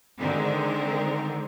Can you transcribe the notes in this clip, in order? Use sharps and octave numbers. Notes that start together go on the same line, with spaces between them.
D3 D#3 G#3 C4 A#4